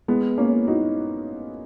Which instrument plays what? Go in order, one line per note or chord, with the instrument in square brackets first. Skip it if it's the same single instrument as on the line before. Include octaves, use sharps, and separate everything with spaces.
[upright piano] G#3 B3
A#3 C#4
D#4 F#4